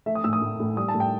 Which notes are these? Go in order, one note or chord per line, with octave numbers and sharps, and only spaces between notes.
A3 E5
D#6
A2 E6
D#6
A2
A2
G3 D#6
A5
A2
G5